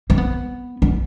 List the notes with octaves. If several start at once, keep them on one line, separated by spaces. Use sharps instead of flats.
C4
B3
B3